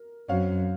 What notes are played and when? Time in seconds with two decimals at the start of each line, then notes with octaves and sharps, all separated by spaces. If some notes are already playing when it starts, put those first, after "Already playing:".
Already playing: A#4
0.29 F#2 C4 F#4 C#5 F5